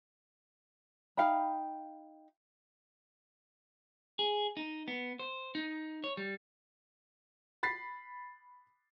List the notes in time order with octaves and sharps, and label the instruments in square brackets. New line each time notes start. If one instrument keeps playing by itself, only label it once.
[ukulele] D#4 F5 G5 B5
[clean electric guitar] G#4
D#4
B3
C5
D#4
C#5
G3
[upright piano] B5 A6 B6 C7